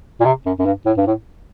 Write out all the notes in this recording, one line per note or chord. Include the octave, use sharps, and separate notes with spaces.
A#2
C3
F#2
F#2
G2
A2
G2
A2